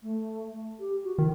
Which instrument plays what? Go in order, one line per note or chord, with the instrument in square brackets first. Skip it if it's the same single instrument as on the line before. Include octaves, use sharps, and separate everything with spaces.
[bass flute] A3
G4
F#4
[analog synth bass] D#3 [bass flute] E4